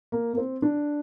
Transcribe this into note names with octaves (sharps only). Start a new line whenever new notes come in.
A#3
A#3
C4
D4